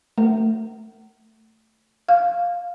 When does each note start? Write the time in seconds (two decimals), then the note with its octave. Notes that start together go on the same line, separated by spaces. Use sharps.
0.18 A3
2.09 F5